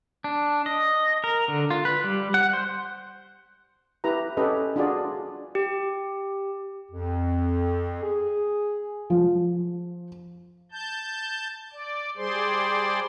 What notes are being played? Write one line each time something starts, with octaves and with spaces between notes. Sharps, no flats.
D4
D#5
A#4
D3
F4
B4
G3
F#5
C5
E4 G4 B4 A#5
C#4 G4 A4 B4 D#5
D4 F4 F#4 G#4 D5
G4
F2
G#4
F3
A5 G6
D5
G3 G#4 C5 D5 C6